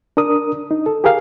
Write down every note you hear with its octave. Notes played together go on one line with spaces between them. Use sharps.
D4 A#4 D#6
D#4
A4
G4 G#4 A#4 F5